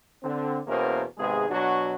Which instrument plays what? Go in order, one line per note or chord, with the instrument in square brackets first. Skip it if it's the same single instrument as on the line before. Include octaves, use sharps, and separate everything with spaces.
[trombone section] D3 C4
E2 B2 A#3 C#4 A#4 C5
G#1 C3 G#3 B3 G#4
B2 F#3 D4 F#4